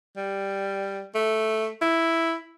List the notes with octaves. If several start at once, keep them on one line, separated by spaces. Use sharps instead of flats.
G3
A3
E4